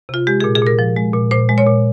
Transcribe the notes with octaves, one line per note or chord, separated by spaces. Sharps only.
C3 F4
G#3 G4
A#2 G#4
G#4
A#2 A#4
F3
G#3
A#2
A#2 C5
G#3
C#5
A#2